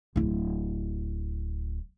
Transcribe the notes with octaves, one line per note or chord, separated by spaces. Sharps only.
D1 E4